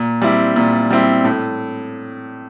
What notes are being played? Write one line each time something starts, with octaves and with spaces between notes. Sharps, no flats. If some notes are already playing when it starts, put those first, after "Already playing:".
Already playing: A#2
G3 C4 E4
A#2
G3 C4 E4
A2